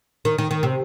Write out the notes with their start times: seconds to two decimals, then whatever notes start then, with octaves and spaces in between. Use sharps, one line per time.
0.25 D#3
0.38 D#3
0.51 D#3
0.63 C3